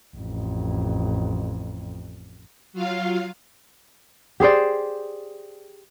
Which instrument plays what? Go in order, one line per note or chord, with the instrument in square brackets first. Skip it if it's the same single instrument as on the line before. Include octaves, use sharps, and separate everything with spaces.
[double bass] A1 F2
[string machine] F#3 F4 F5
[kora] G4 G#4 C5 D5